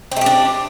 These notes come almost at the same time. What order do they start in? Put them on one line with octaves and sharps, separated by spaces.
C4 A3 G4 D4